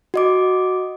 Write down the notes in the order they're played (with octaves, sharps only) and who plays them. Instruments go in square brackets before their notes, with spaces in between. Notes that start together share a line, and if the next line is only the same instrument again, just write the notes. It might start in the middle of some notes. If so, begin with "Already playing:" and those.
[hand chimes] F#4 D#5 D6